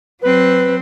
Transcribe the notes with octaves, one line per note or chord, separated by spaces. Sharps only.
F#3 C4 B4